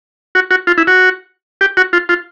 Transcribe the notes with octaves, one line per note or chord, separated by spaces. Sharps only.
F#4
F#4
F4
E4
F#4
G4
F#4
F4
F4